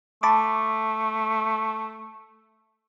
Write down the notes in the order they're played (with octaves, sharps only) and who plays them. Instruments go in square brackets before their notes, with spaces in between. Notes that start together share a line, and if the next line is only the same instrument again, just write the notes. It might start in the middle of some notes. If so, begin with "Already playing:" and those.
[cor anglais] A3 [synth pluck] A5 B5 D6